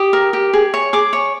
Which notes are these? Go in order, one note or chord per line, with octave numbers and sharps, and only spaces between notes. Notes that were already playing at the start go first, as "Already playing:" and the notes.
Already playing: G4 D#6
A#4
G4
G#4
C#5
G#4 D6
C#5